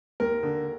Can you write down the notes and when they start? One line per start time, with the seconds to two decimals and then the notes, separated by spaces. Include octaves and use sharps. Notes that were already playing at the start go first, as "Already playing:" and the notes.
0.20 D#2 A#4
0.43 D3